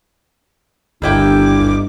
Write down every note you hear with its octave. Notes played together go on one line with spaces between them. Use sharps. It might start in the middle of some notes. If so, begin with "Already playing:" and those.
G1 D2 G2 D#3 E4 G5 D6